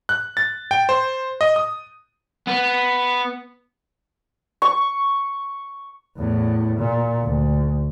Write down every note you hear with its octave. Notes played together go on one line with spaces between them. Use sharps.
F#6
A6
G5
C5
D#5
D#6
B3
C#6
E2 A2
A#2
D2